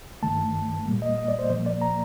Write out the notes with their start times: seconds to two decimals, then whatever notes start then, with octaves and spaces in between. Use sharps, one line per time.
0.22 G2 D#3 A3 A5
0.86 A#2 G3 A#3
1.02 D#5
1.18 D#5
1.28 D5
1.39 C5
1.50 A#2 F3 A#3 C5
1.66 D5
1.82 A#5